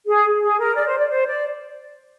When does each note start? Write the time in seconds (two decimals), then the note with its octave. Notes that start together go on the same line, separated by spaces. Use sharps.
0.07 G#4
0.41 G#4
0.58 A#4
0.75 D5
0.86 C5
0.98 D5
1.09 C5
1.26 D5